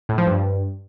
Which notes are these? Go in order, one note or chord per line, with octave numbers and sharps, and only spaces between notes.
A2
F3
G2